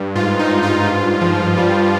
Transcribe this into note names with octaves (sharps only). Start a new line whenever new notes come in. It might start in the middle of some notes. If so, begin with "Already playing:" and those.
Already playing: G2
G#2 F4
D#4
G#2
F4
G2
F3
G3